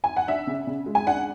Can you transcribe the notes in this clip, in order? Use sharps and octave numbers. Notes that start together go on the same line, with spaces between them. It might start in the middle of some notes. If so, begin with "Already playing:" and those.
G#5
F#5
D4 E5
C#3
C#3
G#3
G#5
D4 F#5